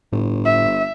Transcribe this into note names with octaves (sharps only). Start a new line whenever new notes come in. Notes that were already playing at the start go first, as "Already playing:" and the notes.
G1 A2
E5